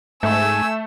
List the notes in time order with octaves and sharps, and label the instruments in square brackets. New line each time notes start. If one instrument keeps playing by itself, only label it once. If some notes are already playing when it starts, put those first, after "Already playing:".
[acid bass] G#2 [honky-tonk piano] A3 [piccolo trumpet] G#5 [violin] E6